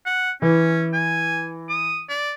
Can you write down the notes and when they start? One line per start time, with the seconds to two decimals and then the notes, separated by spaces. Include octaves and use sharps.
0.06 F#5
0.42 E3 C#4
0.93 G#5
1.69 D#6
2.09 D5